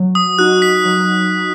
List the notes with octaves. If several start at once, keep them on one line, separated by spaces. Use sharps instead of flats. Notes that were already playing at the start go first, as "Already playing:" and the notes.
Already playing: F#3
D#6
D#4 F#4 F#6
B6
F#3